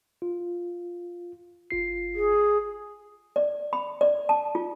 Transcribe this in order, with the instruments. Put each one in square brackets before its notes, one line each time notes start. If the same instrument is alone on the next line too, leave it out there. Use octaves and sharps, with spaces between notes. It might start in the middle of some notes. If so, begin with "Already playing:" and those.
[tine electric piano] F4
G1 F4 C7
[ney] G#4
[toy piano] D5
B5
D5
A5
F4